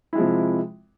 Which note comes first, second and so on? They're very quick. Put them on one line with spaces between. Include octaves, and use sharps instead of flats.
E4 G#3 F3 C3